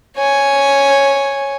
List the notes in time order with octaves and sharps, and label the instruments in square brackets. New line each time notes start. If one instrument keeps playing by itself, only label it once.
[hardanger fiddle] C#5 G#5